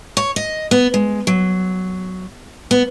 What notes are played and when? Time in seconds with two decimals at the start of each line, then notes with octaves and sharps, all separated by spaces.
0.17 C#5
0.36 D#5
0.71 B3
0.94 G#3
1.27 F#3
2.71 B3